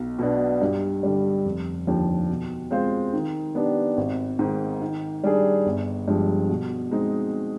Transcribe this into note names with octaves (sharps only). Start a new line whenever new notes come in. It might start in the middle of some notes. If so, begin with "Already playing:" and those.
Already playing: B1
B2 B3 D4
G2
D3 G3
F1
D#2 D3 F3
B2
G#3 C4 F4 C5
D#3
B3 D4 G4
G#1
G#2 D#3
D#3
G3 D4 G#4
G1
G2 F3 G#3
B2
G#3 C4 D#4